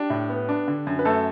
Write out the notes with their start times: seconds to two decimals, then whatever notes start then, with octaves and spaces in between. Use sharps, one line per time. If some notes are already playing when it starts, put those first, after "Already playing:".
Already playing: D4 G4
0.10 A2
0.30 B3
0.49 D4
0.68 D3
0.87 F#2
0.99 B4
1.05 F#2 A3 A4